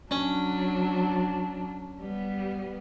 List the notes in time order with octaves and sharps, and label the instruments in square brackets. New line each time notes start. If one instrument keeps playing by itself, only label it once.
[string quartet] F#3 D4 [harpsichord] C#4
[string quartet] G3 B3